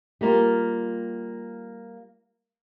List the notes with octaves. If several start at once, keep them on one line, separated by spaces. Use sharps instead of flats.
G3 A#3 F4